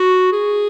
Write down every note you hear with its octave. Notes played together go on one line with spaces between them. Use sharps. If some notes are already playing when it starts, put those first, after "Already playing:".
Already playing: F#4
G#4